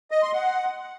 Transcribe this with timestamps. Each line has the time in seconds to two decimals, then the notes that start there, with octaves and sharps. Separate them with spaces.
0.11 D#5
0.22 C6
0.34 F#5